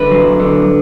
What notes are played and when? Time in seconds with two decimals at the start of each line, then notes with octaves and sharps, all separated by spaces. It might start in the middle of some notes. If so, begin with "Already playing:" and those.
Already playing: D3 B4
0.11 F#3
0.40 D3